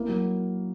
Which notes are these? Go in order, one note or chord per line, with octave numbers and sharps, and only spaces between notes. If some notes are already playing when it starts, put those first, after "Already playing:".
Already playing: A#3 E4
F#3